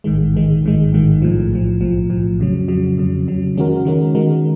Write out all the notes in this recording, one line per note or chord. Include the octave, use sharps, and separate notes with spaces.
A1 G#2 D#3 G#3
A1 G#2 D#3 G#3
A1 G#2 D#3 G#3
A1 G#2 D#3 G#3
B1 A2 F3
B1 A2 F3
B1 A2 F3
B1 A2 F3
F2 C#3 F#3
F2 C#3 F#3
F2 C#3 F#3
F2 C#3 F#3
D#3 G#3 C#4 F#4 A#4
D#3 G#3 C#4 F#4 A#4
D#3 G#3 C#4 F#4 A#4